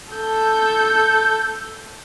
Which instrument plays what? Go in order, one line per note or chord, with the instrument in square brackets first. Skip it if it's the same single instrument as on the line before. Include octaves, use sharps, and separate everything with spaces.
[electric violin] A4 G6